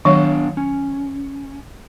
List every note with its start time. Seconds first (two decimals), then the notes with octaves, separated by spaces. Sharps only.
0.05 D#3 F#3 B3 D4 C#5 F5
0.57 C#4